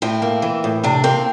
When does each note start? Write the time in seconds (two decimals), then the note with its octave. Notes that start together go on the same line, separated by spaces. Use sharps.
0.02 A2 C4 E4
0.22 A#3
0.42 E3
0.64 A2
0.84 C3 D4
1.04 A#3 C4